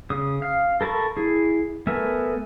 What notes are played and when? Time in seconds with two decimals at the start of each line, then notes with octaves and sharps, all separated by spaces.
0.10 C#3 D#6
0.42 F5
0.81 A4 A#4 A5 B5 C#6
1.17 E4 G#4
1.87 A3 B3 A#4 E5 G#5